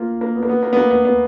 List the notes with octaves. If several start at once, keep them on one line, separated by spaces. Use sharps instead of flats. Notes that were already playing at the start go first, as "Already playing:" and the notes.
Already playing: A#3 F4
A#3
B3
A#3
B3
A#3
B3
A#3
B3
B3